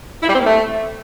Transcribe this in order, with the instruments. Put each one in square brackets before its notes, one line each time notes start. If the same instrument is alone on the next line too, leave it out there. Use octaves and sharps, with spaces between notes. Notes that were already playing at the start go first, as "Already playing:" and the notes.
[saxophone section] E4
G3
C4
A#3
A3